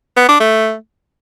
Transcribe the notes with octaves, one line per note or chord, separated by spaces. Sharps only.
B3
D4
A3